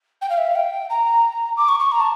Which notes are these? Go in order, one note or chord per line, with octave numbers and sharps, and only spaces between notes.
G5
F5
E5
F5
G5
A#5
D6
C#6
C#6
A#5
A5